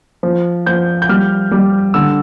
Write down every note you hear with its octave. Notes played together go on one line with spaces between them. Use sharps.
F3
F3 G6
G6
G3 F6
G3
D3 E6